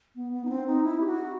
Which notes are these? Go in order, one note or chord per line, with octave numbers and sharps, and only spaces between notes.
B3
B3
D#4
C4
D#4
E4
G4
F#4